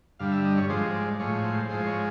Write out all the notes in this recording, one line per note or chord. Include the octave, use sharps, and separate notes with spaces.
G2 D3 G3 F5
E5
D#5
C#5
G#2 F3 G#3 C5
D5
A2 F3 G#3 C#5
C5
G#2 F3 G#3 C5
C#5